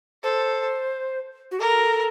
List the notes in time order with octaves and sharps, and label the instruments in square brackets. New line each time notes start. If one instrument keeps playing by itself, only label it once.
[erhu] A4 [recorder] C5
[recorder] F#4
[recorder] A4 [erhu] A#4